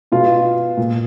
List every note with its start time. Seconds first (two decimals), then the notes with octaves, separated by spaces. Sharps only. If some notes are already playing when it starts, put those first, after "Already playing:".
0.12 B2 F4
0.77 A#2